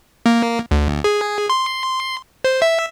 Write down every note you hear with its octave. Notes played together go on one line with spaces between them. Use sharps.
A#3
D2
G#4
C6
C5
E5